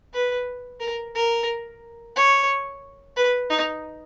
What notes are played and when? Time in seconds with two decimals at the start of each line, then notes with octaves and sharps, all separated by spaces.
0.14 B4
0.80 A#4
1.15 A#4
2.16 C#5
3.16 B4
3.50 D#4